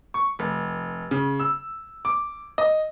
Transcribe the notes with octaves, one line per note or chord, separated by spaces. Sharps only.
C#6
F1
C#3
E6
D6
D#5